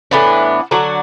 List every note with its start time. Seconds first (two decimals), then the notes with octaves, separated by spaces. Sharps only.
0.11 A2 E3 B3 D4
0.71 D3 F#3 D4 F#4